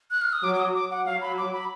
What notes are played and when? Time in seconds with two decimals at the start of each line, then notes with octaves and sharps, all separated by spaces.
0.11 F#6
0.22 F6
0.33 D#6
0.43 F#3 D6
0.55 D6
0.59 D#6
0.74 D6
0.91 F#5
1.06 F#3 F5
1.21 B5
1.38 D6
1.53 B5